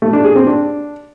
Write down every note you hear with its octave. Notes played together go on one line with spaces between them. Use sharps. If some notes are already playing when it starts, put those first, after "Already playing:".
A3
D4
G#4
C4
D4